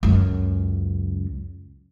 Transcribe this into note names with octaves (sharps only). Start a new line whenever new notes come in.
C#2 F#2